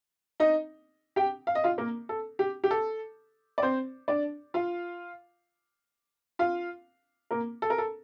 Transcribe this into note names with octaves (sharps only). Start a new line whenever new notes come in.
D#4 D#5
G4 G5
F5
D#5
F4 F5
A#3 A#4
A4
G4
G4
A4
D5
C4 C5
D4 D5
F4 F5
F4 F5
A#3 A#4
A4
A#4
A4